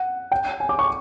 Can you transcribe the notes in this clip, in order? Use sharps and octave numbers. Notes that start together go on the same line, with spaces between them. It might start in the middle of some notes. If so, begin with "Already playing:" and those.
Already playing: F#5
G5
G#5
D6
C#6